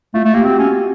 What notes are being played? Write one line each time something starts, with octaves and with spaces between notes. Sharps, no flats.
A3 F4
A3
A#3 G4
C4 F#4
C#4